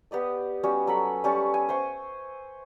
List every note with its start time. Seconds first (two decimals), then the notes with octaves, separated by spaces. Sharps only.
0.11 B3 G4 D5 D#5
0.63 G3 B3 C#4 F#4
0.87 F#3 A4 B5
1.24 G3 C#4 A5 C#6
1.54 G#5
1.69 C5 E5 C#6